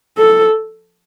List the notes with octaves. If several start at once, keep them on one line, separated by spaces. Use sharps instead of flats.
A4